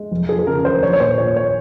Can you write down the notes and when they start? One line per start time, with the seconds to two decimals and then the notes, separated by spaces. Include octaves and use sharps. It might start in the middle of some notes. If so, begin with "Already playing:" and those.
Already playing: G#3
0.11 F1
0.29 F3 G#4
0.39 G#4
0.47 C#3 A#4
0.58 A#4
0.65 D#2 C5
0.82 A#1 C#5
0.93 C#5
1.00 A#2 C5
1.18 A#2 C#5
1.36 C#5